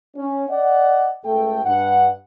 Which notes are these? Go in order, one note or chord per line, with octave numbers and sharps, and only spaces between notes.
C#4
D5 D#5 F#5
C#2 A3 A4 G5
G2 F#5